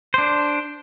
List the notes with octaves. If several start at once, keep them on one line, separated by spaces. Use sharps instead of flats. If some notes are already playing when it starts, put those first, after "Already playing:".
D4 C5